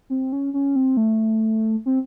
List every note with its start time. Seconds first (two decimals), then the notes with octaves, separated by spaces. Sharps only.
0.10 C4
0.32 C#4
0.54 C#4
0.76 C4
0.97 A3
1.86 C4